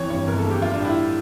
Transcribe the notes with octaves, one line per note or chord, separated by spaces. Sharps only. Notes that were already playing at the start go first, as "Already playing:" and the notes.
Already playing: F2 E3 C#5
G2 C#5
G1 A#4
A4
A#3
G4
G3 F4
D4
A2
E4